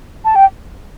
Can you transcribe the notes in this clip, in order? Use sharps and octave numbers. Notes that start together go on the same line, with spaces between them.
A5
G5